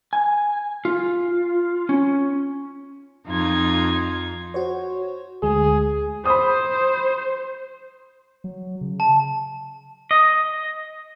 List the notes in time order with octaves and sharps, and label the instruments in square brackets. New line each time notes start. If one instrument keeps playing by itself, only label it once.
[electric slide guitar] G#5
F4
C#4
[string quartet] F2 D#4 F4 G#6
[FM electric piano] F#4 C5 C#5
[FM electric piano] D2 G#3 [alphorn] G#4
[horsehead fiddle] C5 [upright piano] B5 D#6
[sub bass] F#3
C#3
[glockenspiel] A5
[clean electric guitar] D#5